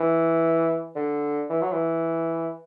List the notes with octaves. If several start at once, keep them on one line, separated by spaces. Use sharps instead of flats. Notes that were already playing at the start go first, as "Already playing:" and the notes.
Already playing: E3
D3
E3
F#3
E3